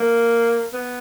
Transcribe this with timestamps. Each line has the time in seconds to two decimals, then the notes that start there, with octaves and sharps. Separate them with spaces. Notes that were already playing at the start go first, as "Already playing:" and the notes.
Already playing: A#3
0.74 B3